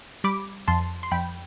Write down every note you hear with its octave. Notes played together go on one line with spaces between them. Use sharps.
G3 B5 D6
F2 A5 C6
C6
F2 G5 B5